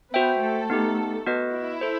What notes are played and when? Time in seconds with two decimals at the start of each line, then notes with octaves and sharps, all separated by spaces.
0.14 B3 F#4 B4 C5 E5 G5
0.42 A3 A4
0.70 B3 D#4 G4
1.26 B3 F#4 B4 D#5
1.53 E4
1.81 A4 C5